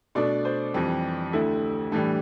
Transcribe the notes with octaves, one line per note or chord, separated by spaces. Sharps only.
B2 A3 D4 D5
C5
F2 E3 G3 C4 G4
D2 D3 A3 E4
A2 E3 G3 D4 A4